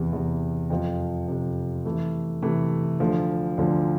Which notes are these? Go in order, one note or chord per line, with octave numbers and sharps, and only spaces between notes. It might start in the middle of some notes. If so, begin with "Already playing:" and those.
Already playing: E2 C3 E3
E2 C3 E3
F2 C3 F3
F2 C3 F3
C3 E3 A3
C3 E3 A3
D2 D3 F3
D2 D3 F3